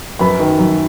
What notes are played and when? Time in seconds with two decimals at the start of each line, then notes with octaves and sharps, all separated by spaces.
0.19 F#2 B4 B5
0.40 D#3
0.59 F#2